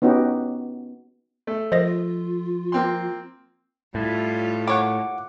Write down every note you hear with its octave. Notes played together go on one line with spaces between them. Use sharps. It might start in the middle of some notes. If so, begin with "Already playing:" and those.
B3 C#4 D#4 F#4 G4
A3
F3 A#4 C5 D#5 A#6
F4
A#3 C4 C6
A2 G3 F4
A3 A#3 C#5 F#5 D6